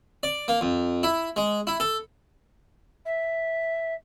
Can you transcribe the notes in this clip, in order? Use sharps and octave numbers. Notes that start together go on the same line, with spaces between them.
D5
A#3
F2
E4
G#3
E4
A4
E5